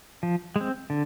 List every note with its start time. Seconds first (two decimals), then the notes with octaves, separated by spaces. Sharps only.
0.23 F3
0.56 G#3
0.61 C4
0.90 D3